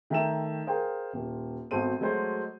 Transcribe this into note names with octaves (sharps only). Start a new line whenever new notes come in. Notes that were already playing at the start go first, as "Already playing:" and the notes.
D#3 A3 E5 G5 A#5 E7
G#4 A#4 C5 F5 G5 G#5
D#1
G#1 B3 F#4 A4 C5 D#7
F#3 G#3 A3 F#4 C5 C#5